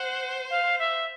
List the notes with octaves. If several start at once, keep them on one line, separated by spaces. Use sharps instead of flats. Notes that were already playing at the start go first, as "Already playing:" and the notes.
Already playing: C5 F#5
F5
E5